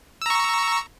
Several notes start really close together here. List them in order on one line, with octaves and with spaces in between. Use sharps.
E6 A#5 C#6